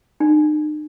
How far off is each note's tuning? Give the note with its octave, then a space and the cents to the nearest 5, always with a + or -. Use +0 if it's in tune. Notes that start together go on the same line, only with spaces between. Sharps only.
D#4 -45